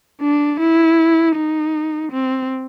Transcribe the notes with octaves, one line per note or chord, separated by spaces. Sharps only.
D4
E4
D#4
C4